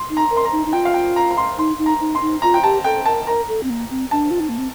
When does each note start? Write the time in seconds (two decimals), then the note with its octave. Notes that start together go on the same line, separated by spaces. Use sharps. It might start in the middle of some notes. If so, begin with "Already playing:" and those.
Already playing: C6
0.10 D#4
0.17 A#5
0.30 A#4
0.37 C6
0.45 A#5
0.52 D#4
0.66 D#4
0.73 F4 G5
0.85 F5
0.94 G5
1.16 A#5
1.31 A#5
1.37 C6
1.58 D#4 C6
1.79 D#4
1.86 A#5
2.01 D#4
2.15 C6
2.22 D#4
2.42 F4 A#5
2.54 G5
2.63 G4 A5
2.84 A4 G5
3.05 A#4 A5
3.26 A#4 A#5
3.48 A4
3.63 C4
3.70 A#3
3.90 C4
4.11 D4 A5
4.31 F4
4.40 D#4
4.49 A#3
4.58 C4